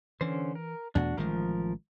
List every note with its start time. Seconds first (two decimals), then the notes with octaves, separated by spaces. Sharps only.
0.21 D3 E3 C#4 C5
0.55 A#4
0.95 E2 B2 A3 D4 F#4
1.17 A1 D#3 F3 G#3 A#4